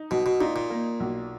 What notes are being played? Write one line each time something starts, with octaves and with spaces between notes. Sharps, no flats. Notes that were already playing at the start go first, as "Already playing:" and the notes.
Already playing: D#4
B1 B2
B2
A#2 D#4
A#2
A#3
B1